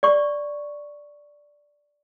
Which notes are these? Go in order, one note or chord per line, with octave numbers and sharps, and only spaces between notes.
D5 C#6